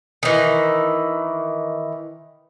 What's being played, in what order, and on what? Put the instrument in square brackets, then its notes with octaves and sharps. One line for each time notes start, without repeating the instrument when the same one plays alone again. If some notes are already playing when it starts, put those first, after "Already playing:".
[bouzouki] D#3 E3